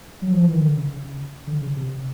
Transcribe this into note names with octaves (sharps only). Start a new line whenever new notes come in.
F#3
F3
E3
D#3
D3
C#3
C#3
C#3
D3
C#3
C3